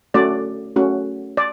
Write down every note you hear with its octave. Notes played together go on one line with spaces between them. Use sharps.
A3 C#4 F#4 D5
A3 C#4 F#4
D5